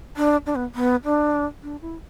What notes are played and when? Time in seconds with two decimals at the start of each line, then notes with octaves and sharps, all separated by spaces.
0.17 D4
0.46 D4
0.56 B3
0.75 B3
1.05 D4
1.63 D4
1.82 E4